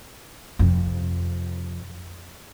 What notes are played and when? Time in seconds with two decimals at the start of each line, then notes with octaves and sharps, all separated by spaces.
0.59 F2 C3